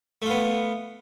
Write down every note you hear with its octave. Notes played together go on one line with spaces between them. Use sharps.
A3 B3 F4